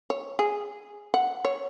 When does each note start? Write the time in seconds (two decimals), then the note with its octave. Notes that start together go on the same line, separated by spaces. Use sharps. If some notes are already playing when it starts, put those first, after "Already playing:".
0.10 C#5
0.39 G#4
1.14 F#5
1.45 C#5